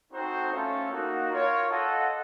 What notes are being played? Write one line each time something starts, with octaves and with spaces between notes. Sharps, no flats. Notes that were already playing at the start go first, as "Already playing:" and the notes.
C4 D#4 F#4 A4 C5
A3 C#4 F4 A4 C#5
A#3 D#4 F#4
F4 A#4 C#5
F4 A4 D#5 F#5